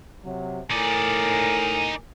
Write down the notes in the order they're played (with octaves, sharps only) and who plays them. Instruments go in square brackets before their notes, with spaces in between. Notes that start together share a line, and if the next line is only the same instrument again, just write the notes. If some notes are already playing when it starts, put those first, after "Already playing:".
[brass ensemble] C3 F#3
[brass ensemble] A2 A#4 G#5 [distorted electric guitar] D#4 D5